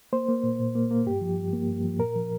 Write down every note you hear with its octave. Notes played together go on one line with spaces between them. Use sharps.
A#3 C5
A#3
A#2
A#2
A#3
A#3
G2 G4
F3
G2
A#3
G2
F3
A#2 A#4
F3